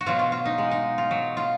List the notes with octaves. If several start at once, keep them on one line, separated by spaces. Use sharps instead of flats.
F#4
B2 F#3 F4
F4
F4
D#4
G#3
D#4
F4
F#3
F4